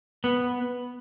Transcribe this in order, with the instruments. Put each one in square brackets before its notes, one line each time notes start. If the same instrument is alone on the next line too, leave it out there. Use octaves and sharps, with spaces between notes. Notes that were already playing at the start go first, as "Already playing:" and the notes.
[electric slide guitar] B3